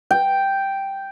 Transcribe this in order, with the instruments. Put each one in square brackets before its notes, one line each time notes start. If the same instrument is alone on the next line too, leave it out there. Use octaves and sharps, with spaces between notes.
[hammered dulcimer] G5